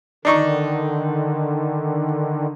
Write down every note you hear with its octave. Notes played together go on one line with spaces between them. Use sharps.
D3 D#3 D4 D#4 C#6